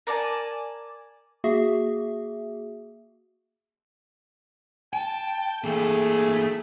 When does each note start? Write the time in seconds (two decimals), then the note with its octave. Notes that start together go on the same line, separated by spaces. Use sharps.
0.07 A#4 D5 G#5 A5
1.44 A#3 F#4 G#4 E5
4.93 G5 A5
5.64 E3 A3 A#3 G#4